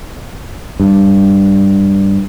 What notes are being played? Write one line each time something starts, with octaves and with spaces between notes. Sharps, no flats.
G2